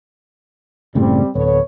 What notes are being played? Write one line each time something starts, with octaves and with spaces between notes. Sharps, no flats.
F#1 A2 C#3 G3 C4
D1 B3 A4 C#5